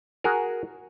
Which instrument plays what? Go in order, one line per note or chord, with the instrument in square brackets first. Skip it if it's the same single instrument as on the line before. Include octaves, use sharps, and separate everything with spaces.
[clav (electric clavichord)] F#4 G#4 A#4